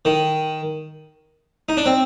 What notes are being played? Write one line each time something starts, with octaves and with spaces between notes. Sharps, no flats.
D#3
D#4
D4
C4